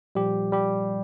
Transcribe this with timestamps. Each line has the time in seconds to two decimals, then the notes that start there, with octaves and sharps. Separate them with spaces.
0.15 A#2 F3 G3 G4
0.52 G3 G4